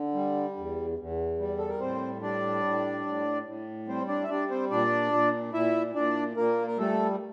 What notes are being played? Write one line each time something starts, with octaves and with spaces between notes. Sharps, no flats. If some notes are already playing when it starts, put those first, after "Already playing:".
Already playing: D3
G3
E2
E2
G3
A4
A#4
A2 C4 C5
G3 D4 D5
A2
A2
A2
G3 C4 C5
D4 D5
E5
G3 D4 D5
C4 C5
A#2 D4 D5
A#2
A#2 E4 E5
A#2 D4 D5
A#2 A#3 A#4
A#4
G3 A3 A4